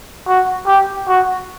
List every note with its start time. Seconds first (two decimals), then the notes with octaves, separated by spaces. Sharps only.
0.28 F#4
0.67 G4
1.08 F#4